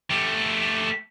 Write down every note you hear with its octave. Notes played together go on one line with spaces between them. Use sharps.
A3 G4